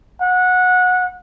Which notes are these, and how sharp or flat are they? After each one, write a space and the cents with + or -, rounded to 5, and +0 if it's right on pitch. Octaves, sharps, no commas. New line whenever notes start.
F#5 -20